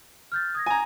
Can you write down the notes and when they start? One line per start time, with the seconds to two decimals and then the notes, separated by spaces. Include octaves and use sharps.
0.32 F6 G6 A6
0.55 D#6 G#6 A#6
0.66 G#5 A#5